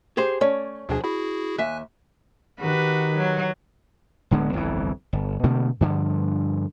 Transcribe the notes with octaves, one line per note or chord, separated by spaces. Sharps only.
G4 G#4 C5
A3 C#4 C#5 D5
D2 B2 F3 D4 G#4
E4 F#4 G#4 B5
D#2 E5 G#5 F#6
D#3 F#4 G4 B4
F#3
D1 D3 G#3 B3
G1 C2 F2 E3
G1
B2 D3 A3 A#3
G2 D3 F3